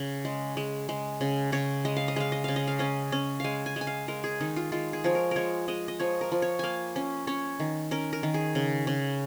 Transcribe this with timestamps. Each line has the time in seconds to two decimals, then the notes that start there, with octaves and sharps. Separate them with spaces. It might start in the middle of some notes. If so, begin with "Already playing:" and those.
Already playing: C#3
0.25 G#3
0.57 G#3
0.89 G#3
1.21 C#3
1.52 C#3 C#5
1.85 G#3 D#5
1.96 F5
2.08 D#5
2.16 G#3 F5
2.32 D#5
2.44 C#3 F5
2.56 D#5
2.67 F5
2.79 C#4 D#5
3.12 C#4
3.40 G#3 F5 G#5
3.66 G#5
3.76 G#3 G#5
3.87 F5
4.08 G#3 A#4
4.24 G#4
4.40 D#3 D#4
4.56 F4
4.72 G#3 F4
4.93 G#4
5.04 F3 C#5
5.15 A#4
5.31 G#3 A#4 C#5
5.68 G#3 D#5
5.88 D#5
5.99 F3 C#5
6.21 A#4
6.32 F3
6.42 C#5
6.59 A#3 F5 G#5
6.96 C#4
7.27 C#4 C#5
7.60 D#3
7.91 C#4 A#4
8.13 A#4
8.23 D#3
8.34 G#4
8.55 C#3
8.87 C#3